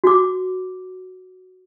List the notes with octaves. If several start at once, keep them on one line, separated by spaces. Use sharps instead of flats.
F#4 D6